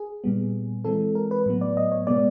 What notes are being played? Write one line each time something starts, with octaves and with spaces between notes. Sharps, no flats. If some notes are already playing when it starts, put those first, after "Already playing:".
Already playing: G#4
A#2 G3 B3
E3 G#3 C4 A4
A#4
B4
A2 F#3 B3
D5
D#5
C#5
B2 G#3 B3 D5